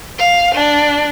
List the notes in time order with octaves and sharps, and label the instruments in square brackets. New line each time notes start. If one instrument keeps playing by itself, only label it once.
[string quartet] F5
D4